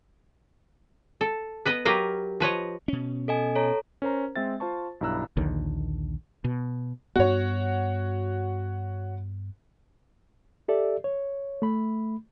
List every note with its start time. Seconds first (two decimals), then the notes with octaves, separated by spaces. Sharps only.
1.21 A4
1.65 B3 B4 D#5
1.85 F#3 G4 A#4 B4 D#5 F5
2.40 F3 B4 C#5 D#5
2.88 B2 C#4
3.28 A4 D#5 G#5
3.55 A4 C#5 A#5
4.02 C#4 A#4 C5 A#5
4.35 G#3 C4 E5 A6
4.60 F4 C5 A5 C#6
5.01 B1 G2 E4 A#5 E6 F#6
5.37 A#1 D#2 D3 D#3
6.44 B2
7.16 G2 B3 F#4 C#5
10.68 G4 A4 D5 E5
11.04 C#5
11.62 A3 B5